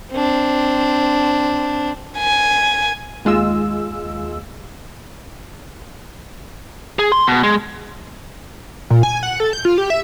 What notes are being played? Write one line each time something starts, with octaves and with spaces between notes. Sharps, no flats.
C4 D4
G#5
D#2 G#3 F4 E6
G#4
C6
B2
G#3
A#2
G#5
F#5
A4
G6
F4
G4
E5